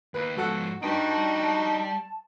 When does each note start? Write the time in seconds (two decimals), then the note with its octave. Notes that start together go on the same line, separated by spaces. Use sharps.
0.14 D#2 B4
0.37 G#2 F3 F#4 A4 F#5
0.83 G2 G3 D#4 F#4 G5 A5